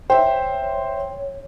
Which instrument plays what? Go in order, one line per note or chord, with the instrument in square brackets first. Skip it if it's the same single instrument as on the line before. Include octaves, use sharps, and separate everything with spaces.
[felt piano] C5 E5 [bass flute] C#5 [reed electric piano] G5